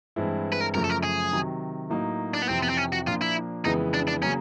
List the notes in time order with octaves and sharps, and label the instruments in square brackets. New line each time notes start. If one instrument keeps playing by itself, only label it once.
[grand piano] G2 E3 G#3 C4 E4
[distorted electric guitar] B4
A#4
[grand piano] F#2 C#3 F3 A3 [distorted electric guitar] A#4
[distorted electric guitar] A4
A#4
G#4
[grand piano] C3 D#3 F#3
A2 F#3 A#3 D#4
[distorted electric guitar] D4
B3
[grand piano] F2 C3 E3 [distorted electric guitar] C4
[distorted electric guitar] B3
C4
C#4
F#4
[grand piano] A#2 F3 A#3 D4 [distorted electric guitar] F4
[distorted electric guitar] E4
[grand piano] F2 C#3 E3 G#3 B3 [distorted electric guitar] D#4
[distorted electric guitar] D4
D4
[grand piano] C#3 F#3 A#3 [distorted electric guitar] C#4